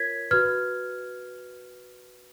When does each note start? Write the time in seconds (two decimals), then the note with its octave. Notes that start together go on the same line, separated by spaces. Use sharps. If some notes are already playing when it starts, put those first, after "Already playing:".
Already playing: F4 A#4 C#5 G#6 B6
0.31 F#4 B4 F6 G#6